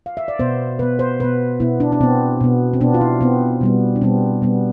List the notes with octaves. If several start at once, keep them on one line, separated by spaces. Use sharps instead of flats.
F5
E5
D5
B2 B3 C5
B2 B3 B4
C5
B2 B3 B4
B2 B3 E4
D4
D4
B2 B3 C4
B2 B3
C4
B2 B3 D4
F4
E4
B2 B3 C4
B2 G3 B3
D4
B2 G3 B3 C4
B2 G3 B3